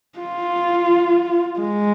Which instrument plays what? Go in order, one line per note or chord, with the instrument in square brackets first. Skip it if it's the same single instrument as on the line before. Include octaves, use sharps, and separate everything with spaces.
[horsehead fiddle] F4
G#3